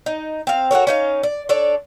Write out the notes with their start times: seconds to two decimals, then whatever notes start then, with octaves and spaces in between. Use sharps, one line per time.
0.06 D#4
0.47 C4 F5
0.71 F#4 A4 A#4 C#5
0.87 C#4 D#4 F5
1.23 D5
1.49 D4 A4 C#5 D5